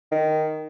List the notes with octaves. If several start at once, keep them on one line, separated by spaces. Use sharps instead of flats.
D#3